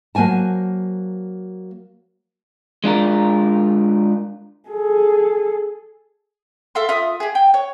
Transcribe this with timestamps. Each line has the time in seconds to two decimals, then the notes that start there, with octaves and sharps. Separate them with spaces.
0.15 F#3 A#3 C5 G#5 A5
2.84 G#3 D4 F4 A#4
4.69 G#4 A4
6.75 A4 E5 F5 C6
6.89 F4 E5 D#6
7.20 G4 G#4
7.35 G5
7.54 C#5